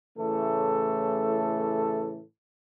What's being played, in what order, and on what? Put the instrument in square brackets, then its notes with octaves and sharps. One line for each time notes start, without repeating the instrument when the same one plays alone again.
[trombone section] A2 C#3 E3 A3 A4